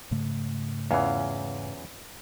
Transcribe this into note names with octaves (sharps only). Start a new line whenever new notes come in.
G#2 C#3 A3
E2 E3 C#4 F4 F5